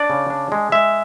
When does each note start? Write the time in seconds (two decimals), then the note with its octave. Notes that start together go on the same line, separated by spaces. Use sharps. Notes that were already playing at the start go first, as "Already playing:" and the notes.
Already playing: D4 D5
0.10 C#3
0.30 D4
0.52 G#3
0.72 G#3 E5